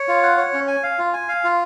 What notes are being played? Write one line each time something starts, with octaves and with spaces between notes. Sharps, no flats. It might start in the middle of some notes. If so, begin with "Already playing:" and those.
Already playing: C#5
F4
F#5
C#5
C#4
G#5
F5
F4
G#5
F5
F4